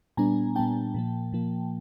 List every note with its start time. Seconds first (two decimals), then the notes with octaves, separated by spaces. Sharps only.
0.17 A#2 G3 B3 D4 G#5 A#5
0.56 A#2 G3 B3 D4 G5 A5
0.94 A#2 F3 A#3
1.33 A#2 F3 A#3